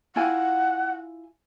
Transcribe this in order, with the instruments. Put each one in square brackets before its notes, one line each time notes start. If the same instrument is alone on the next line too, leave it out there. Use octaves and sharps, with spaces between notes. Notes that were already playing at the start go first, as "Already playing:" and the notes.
[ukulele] E4 F4 G#5 [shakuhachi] F#5